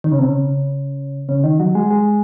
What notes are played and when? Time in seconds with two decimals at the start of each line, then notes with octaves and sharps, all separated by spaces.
0.04 D#3
0.12 C#3
0.19 C3
0.27 C#3
1.29 C#3
1.44 D#3
1.60 F#3
1.75 G#3
1.91 G#3